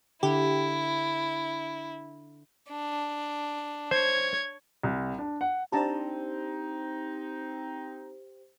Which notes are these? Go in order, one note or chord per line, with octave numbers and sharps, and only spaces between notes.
D3 E4 G4
D4
C5 C#5 G#6
C2
D4
F#5
C4 D4 D#4 G4 C5 A5 A#5